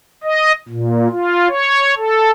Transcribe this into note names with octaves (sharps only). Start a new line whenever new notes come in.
D#5
A#2
F4
C#5
A4